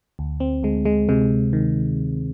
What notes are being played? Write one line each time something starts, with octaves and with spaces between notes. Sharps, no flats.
D2
C4
D2 G#3
G#3
C3 G#3
D#3